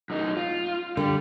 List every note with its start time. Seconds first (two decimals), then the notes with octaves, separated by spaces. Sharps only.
0.10 F#2 D#4
0.37 F4
0.97 D3 G3